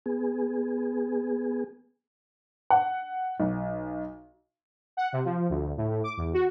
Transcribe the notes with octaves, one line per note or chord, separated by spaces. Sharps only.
B3 G#4
F#5
B1
F#5
C3
F3
D2
A2
A2
D6
E2
F#4